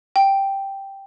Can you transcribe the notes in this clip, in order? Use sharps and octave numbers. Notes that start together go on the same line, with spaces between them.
G5